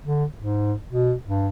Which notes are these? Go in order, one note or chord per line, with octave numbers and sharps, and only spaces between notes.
D3
G#2
B2
G2